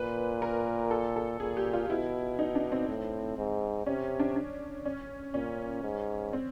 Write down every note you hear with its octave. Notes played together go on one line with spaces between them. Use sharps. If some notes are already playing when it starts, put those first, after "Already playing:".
Already playing: A#2 B4
A#4
A4
A4
A#2 G#4
G4
F4
B2 E4
D#4
D4
C4
A2
G#2
C3 C#4
D4
D4
C#4
A#2 C#4
G#2
C4